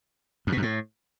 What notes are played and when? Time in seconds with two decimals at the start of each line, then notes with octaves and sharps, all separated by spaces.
0.47 F2
0.52 B2
0.57 F#2
0.62 A2